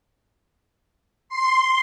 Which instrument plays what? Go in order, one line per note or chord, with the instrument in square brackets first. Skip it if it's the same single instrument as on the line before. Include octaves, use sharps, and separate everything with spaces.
[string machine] C6